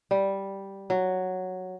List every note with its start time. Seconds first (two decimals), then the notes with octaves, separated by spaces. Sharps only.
0.11 G3
0.90 F#3